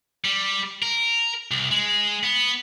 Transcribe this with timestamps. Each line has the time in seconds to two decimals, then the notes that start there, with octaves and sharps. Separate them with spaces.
0.25 G3
0.83 A#4
1.51 C2
1.71 G#3
2.23 B3